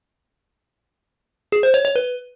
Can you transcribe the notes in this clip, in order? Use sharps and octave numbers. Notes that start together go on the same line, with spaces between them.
G#4
C5
C#5
C#5
B4